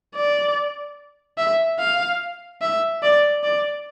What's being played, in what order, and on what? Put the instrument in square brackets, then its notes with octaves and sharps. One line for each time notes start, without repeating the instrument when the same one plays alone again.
[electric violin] D5
E5
F5
E5
D5
D5